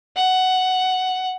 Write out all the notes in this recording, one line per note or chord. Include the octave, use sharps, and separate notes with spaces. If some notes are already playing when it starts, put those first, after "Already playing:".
F#5